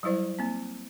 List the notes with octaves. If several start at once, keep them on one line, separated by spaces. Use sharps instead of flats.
F#3 G3 E4 C5 D5
A#3 C4